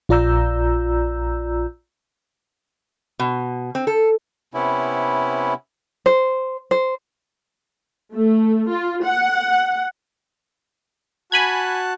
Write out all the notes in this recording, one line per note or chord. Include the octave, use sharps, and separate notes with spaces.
A#1 F4 D5 A#5 E6 G6
B2
C4
A4
C3 B3 C#4 E4
C5
C5
A3
F4
F#5
F#4 G#5 A5 B5 F#6 G#6